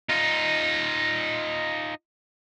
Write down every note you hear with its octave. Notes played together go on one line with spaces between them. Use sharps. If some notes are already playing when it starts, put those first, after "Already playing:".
D#4 F4